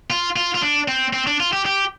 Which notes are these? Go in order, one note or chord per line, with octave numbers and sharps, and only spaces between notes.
F4
F4
F4
D4
C4
C4
D4
F4
G4
G4